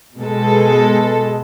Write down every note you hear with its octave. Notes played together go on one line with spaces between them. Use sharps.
B2 G#3 A4